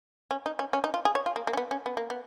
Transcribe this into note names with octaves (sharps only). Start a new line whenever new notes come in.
C#4
D#4
C#4
C#4
D#4
F4
G#4
C#5
F4
A#3
A#3
C#4
B3
C#4
B3
A#3
B3